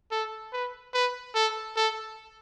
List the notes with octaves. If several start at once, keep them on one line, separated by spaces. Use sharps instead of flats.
A4
B4
B4
A4
A4